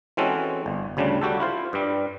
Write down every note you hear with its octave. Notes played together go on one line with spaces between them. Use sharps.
E3 G#3 C4 C#4 F#4 A4
G1
D2 C#3 G3 D4
G3 F#4 G4 A4
E4 F4 C5
G2 G3